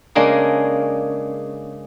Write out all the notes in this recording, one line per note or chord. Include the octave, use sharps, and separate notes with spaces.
C#3 G#3 A#3 D4 G#4